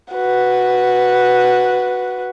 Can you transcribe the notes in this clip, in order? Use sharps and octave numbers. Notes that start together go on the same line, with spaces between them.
F#4 B4